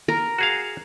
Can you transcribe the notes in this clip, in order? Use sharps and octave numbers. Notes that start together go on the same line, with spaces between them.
A#4
F#4 G#4 F5